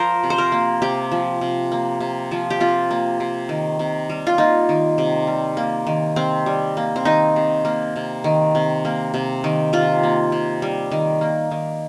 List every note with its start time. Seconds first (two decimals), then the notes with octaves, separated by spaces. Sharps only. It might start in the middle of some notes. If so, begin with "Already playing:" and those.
Already playing: F3 A#4 C5
0.23 C3
0.30 C5
0.38 A#4
0.52 A#3
0.82 C3 G4
1.12 F3
1.41 C3
1.72 A#3
2.00 C3
2.31 F3
2.50 G4
2.60 C3 F4
2.91 A#3
3.20 C3
3.49 D#3
3.79 C3
4.10 G3
4.27 F4
4.38 A#3 D#4
4.69 D#3
4.98 C3
5.27 G3
5.57 A#3
5.87 D#3
6.16 C3 C4
6.46 G3
6.77 A#3
6.96 C4
7.05 D#3 D#4
7.36 C3
7.65 A#3
7.96 C3
8.24 D#3
8.55 C3
8.85 A#3
9.14 C3
9.44 D#3
9.73 C3 F4
10.03 A#3
10.32 C3
10.62 G3
10.91 D#3
11.21 A#3
11.51 D#3